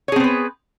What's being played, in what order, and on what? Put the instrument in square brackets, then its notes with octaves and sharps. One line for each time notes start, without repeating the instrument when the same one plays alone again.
[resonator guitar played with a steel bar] C#5
G#4
C4
B3
B4